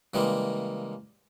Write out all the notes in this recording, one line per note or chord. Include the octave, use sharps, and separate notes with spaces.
C#3 E3 G3 G#3 A#3